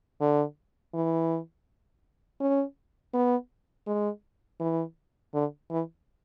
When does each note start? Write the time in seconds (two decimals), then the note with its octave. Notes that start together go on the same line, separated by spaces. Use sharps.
0.21 D3
0.94 E3
2.40 C#4
3.14 B3
3.87 G#3
4.60 E3
5.34 D3
5.70 E3